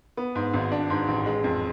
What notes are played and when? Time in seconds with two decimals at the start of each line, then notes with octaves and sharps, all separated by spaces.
0.17 B3
0.36 G#2
0.54 G#1
0.72 D4
0.90 G#2
1.08 A1
1.26 G#3
1.44 F2